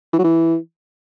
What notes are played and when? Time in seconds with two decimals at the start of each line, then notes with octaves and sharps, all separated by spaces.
0.13 E3
0.19 F#3
0.24 E3